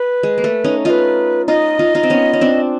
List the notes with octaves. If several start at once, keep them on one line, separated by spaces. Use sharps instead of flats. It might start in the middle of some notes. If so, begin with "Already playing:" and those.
Already playing: B4
G#3
A#3
A3
C#4 D#4
D#4 F4 B4 D#5
D#4 F4 D#5
D#4 F4
D#4 F4
C4
B3 C#4
C#4
C4 D4